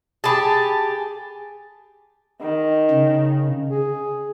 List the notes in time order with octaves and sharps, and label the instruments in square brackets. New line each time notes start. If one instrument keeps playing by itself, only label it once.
[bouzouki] G4 G#4 [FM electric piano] A5 A6 [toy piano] B5 D6
[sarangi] D#3
[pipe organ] C#3
[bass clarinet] G#4